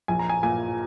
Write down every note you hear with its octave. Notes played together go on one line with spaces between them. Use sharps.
A#1 G#5
A#5
G#5
A#2 G#5